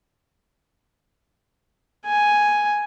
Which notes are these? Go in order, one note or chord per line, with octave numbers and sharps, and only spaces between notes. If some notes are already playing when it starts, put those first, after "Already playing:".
G#5